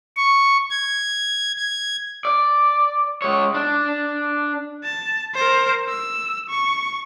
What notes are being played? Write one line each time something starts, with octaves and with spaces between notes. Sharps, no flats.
C#6
G#6
G#6
D5
G#3 C#5
D4
A5
A#4 C5
E6
C#6